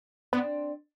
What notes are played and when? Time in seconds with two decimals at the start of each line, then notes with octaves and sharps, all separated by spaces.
0.33 B3 C4 D4